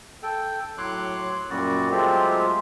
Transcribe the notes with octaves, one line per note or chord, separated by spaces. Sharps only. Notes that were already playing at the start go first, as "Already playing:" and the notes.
A4 G5
A2 F#3 C#5 C6 D6 F#6
F#2 A#2 G3 F#4 D5
F#3 G#3 A3 C4 F4 G4